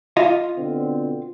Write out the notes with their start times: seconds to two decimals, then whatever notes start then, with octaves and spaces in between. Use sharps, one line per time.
0.17 F4 D#5 F5
0.57 B2 D3 C4